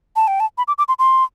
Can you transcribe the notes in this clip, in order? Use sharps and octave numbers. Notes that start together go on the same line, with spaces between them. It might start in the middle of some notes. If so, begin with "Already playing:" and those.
A5
G5
A5
B5
D6
D6
C6
C6